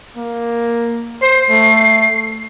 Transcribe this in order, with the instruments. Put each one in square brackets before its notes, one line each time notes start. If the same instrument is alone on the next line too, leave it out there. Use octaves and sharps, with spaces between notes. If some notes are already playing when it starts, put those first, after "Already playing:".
[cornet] A#3
[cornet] C5 [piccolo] C7
[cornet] A3